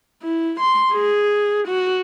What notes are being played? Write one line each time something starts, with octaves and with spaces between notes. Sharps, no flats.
E4
C6
G#4
F#4